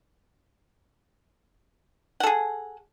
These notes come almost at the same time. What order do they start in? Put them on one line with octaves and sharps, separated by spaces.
F#5 A4 G#4